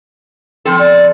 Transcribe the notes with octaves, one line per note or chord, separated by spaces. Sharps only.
F3 C4 A4 G5
D5